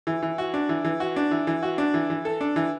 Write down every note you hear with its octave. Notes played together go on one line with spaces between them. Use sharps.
E3
E3
F#4
D4
E3
E3
F#4
D4
E3
E3
F#4
D4
E3
E3
A4
D4
E3